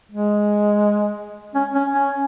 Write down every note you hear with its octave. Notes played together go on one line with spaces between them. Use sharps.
G#3
C#4
C#4
C#4